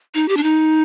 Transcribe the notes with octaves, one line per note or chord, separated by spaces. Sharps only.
D#4
G4
D4
D#4